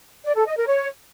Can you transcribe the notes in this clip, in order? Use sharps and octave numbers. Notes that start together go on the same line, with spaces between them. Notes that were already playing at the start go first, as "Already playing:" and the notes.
D5
A4
D#5
A#4
C#5